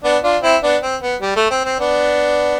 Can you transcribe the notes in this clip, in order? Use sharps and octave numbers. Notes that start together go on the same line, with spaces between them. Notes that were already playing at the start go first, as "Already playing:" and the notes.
B3 D4
D4 F4
C4 E4
B3 D4
C4
B3
G3
A3
C4
C4
B3 D4